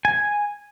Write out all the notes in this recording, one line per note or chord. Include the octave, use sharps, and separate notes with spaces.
G#5